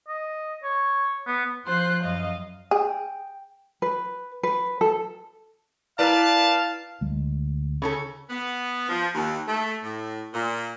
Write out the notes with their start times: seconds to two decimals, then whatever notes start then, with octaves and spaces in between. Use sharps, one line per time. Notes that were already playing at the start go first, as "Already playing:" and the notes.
0.08 D#5
0.63 C#5
1.27 B3
1.66 F3 F4 C5 C6 F#6
2.02 F#2 D#5 F5
2.71 G#4 G5
3.82 B4
4.43 B4
4.81 A4
5.99 E4 A#4 B4 D5 F5 A5 A#5
7.01 D2 G#3
7.82 C#3 C#4 A4
8.30 B3
8.89 F3
9.15 D#2
9.48 A3
9.83 A2
10.34 A#2